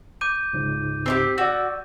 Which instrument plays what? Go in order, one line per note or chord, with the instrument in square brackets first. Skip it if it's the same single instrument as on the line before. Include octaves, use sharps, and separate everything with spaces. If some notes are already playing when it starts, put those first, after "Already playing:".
[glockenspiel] D6 G6 D#7
[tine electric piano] C#2 G#2
[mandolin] C4 D4 G4
[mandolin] F#4 [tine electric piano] D5 E6